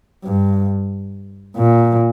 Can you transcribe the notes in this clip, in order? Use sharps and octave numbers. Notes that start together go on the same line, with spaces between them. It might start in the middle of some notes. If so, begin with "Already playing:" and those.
G2
A#2